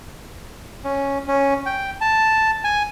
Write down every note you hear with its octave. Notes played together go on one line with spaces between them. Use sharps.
C#4
C#4
G5
A5
G#5